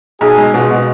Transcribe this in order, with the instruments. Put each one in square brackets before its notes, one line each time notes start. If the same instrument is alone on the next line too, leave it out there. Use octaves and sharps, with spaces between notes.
[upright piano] B1 [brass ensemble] G#4
[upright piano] G#3
[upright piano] B2 [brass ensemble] F4
[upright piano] B2